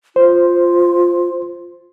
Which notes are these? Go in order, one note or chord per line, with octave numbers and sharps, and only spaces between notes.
F4 C5